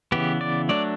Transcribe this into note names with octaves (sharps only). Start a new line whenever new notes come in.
C#3 E3 B3 G4
D5
F#3 A3 D4 D5